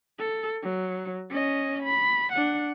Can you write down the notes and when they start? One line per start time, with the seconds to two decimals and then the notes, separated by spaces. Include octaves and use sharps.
0.19 A4
0.63 F#3
1.30 C#4 D#5
1.83 B5
2.33 D4 F#5